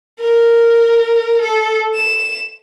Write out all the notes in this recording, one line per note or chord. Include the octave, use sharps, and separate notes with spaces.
A#4
A4
E7